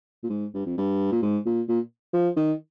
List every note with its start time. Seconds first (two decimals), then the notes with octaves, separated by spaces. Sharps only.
0.23 A#2
0.30 G#2
0.54 G2
0.66 F2
0.78 G2
1.12 A#2
1.22 G#2
1.46 A#2
1.69 A#2
2.13 F3
2.37 D#3